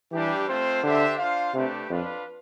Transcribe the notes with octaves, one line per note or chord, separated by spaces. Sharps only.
E3 G3 D4 G4
A3 C4 F4 C5
D3 D4 G4 C5 E5
D4 F4 C5 F5
C3 A3 D4 G4 B4
F2 D4 F4 B4